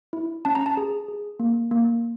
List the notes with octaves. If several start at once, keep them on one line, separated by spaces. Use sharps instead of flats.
E4
C#4 A5
A#5
A5
G#4
G#4
A#3
A#3